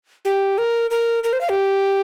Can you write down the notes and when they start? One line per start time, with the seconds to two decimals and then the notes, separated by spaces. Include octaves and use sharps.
0.25 G4
0.58 A#4
0.91 A#4
1.24 A#4
1.33 C5
1.41 F5
1.49 G4